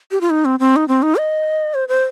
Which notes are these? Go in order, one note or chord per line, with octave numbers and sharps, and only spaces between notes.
G4
F4
D#4
C4
C4
D#4
C4
D#4
D#5
C5
C5